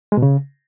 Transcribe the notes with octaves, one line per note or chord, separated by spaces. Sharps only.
G#3
B2
C#3